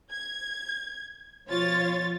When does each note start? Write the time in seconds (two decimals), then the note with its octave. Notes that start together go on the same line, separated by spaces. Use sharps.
0.11 G#6
1.49 B2 F3 F4 C#5 A6